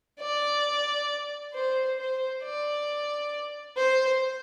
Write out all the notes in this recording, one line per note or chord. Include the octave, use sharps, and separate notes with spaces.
D5
C5
C5
D5
C5